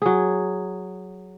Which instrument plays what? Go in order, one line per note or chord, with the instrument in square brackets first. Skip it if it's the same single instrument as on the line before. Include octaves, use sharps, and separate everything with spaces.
[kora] F#3 G#4